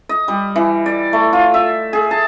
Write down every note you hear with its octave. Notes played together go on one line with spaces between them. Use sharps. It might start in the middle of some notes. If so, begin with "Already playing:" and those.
D#5
G3
E3
D5
A3
F4
E5
G#4
A5